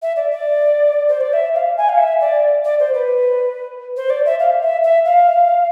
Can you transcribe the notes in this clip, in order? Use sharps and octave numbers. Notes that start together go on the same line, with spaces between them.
E5
D5
D5
C5
D5
E5
F5
G#5
F5
E5
D5
D5
C5
B4
C5
D5
E5
F5
E5
E5
F5